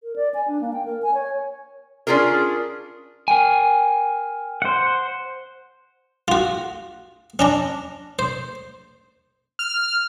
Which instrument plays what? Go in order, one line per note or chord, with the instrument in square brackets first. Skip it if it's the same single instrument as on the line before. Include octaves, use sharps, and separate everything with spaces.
[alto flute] A#4
D5
G#5
D4
A#3
G5
A#4
G#5
C#5
[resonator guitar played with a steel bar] C#4 D4 F4 G#4 A#4
[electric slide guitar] A#4 G5 G#5
[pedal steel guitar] C5 F#5
[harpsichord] F4 F#4
C#4 D4 A#5
C5
[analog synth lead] F6